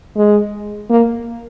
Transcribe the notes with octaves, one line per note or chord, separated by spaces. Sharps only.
G#3
A#3